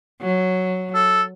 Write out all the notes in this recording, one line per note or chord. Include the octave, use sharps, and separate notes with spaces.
F#3
A4